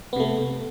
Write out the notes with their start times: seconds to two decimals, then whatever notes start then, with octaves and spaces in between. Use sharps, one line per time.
0.13 B3
0.16 C3
0.20 A3